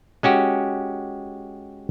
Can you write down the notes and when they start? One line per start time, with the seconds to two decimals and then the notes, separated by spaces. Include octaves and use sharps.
0.23 G#3 C#4 F#4 G4